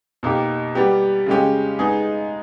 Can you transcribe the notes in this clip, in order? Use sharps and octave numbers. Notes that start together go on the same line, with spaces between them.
B2 A#3 D#4 G4
G3 B3 G4
C#3 G#3 C#4 G4
G#3 B3 D#4 G#4